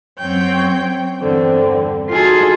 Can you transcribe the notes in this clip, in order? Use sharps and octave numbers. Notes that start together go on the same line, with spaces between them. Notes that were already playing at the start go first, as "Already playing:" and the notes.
F#2 F#3 C4 C#5 G5 G6
E2 G2 D3 C4
D#4 F4 F#4 G#4 A4